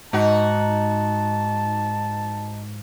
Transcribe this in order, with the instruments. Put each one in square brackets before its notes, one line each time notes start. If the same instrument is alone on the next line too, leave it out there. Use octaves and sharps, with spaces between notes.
[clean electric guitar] G#2 [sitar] D#4 F#4 [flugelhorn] A5